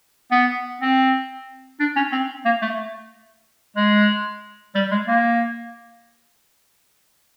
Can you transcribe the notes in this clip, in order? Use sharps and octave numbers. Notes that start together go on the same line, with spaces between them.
B3
C4
D4
C#4
C4
A#3
A3
G#3
G3
G#3
A#3